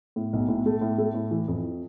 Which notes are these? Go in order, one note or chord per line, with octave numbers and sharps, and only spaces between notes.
A2
B1
A2
A3
A2
A3
A2
E3
F2